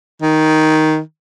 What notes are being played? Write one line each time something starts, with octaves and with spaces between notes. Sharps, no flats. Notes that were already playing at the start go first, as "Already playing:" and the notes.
D#3